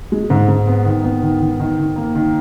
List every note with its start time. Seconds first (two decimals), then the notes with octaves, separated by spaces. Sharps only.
0.12 G#3
0.30 G#2
0.49 G#2
0.67 B3
0.85 D#3
1.04 B3
1.22 D#3
1.40 D#3
1.60 D#3
1.78 D#3
1.96 A#3
2.15 D#3